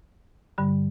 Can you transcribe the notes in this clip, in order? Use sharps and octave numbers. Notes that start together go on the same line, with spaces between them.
G2 D3 G3